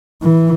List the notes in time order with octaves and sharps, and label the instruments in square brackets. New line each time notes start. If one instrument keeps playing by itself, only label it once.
[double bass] E3